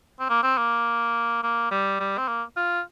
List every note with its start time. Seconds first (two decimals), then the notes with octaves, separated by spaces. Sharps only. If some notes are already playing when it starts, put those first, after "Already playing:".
0.20 C4
0.30 A#3
0.43 C4
0.58 A#3
1.43 A#3
1.71 G3
2.00 G3
2.18 C4
2.28 A#3
2.57 F4